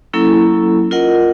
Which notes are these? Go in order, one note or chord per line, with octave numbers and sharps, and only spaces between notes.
F#3 A#3 C#4 E4 A4
F4 A#4 D#5 F#5